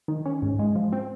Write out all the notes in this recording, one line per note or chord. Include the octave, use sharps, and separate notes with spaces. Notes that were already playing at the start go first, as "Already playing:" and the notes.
D#3
C#4
G#2
G#3
F3
C4